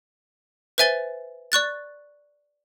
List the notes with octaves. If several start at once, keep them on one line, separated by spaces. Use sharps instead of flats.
B4 C5 E5 G#5 A6 G7
D5 C#6 F#6 A6